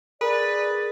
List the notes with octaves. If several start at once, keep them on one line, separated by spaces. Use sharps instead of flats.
G#4 A#4 B4 D5 D#6